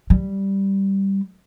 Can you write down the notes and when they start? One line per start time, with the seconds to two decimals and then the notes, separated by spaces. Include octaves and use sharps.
0.10 G3